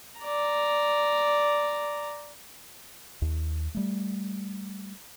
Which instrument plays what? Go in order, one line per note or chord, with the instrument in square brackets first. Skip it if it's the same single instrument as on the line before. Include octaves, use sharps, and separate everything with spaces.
[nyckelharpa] D5 A#5
[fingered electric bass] D#2
G3 A3